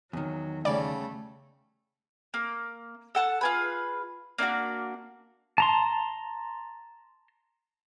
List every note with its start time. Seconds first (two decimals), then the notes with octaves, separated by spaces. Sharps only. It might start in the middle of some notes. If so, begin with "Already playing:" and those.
0.13 E2 D#3 F#3
0.65 C#3 G3 A3 D5
2.34 A#3
3.15 A4 F#5 A5 F#6
3.41 F4 G#4 B4
4.38 A#3 D4 D#4 F#4
5.58 A5 A#5 C6